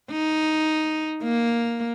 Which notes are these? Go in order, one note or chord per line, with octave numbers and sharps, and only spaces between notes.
D#4
A#3